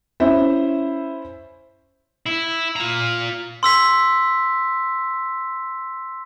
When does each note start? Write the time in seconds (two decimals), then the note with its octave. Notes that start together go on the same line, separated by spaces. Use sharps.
0.20 C#4 E4 C5 E5
2.26 E4
2.76 F4 A#5
3.63 C6 E6 B6